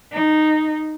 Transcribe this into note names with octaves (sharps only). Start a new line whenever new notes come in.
D#4